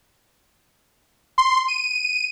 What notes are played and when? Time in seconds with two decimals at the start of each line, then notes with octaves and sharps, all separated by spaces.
1.38 C6
1.68 D#7